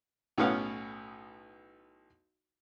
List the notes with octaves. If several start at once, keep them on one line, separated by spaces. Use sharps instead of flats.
B1 A2 B3 C#4 F5 F#5